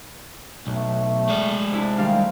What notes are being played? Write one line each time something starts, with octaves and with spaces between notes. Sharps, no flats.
B1 A3
G#3 D5
C3 D4 E4
D2 D#3 G3 F5